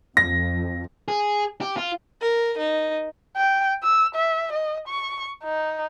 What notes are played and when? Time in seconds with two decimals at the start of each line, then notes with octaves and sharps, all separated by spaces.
0.17 F2 A#6
1.08 G#4
1.61 G4
1.77 F4
2.21 A#4
2.58 D#4
3.36 G5
3.83 E6
4.15 E5
4.52 D#5
4.88 C#6
5.44 D#4